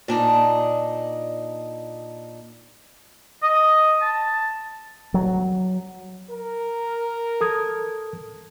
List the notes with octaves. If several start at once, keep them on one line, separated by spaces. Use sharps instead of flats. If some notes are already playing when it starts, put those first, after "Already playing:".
A#2 D4 D#4
D#5
A5
F#3
A#4
A4 D#6 G#6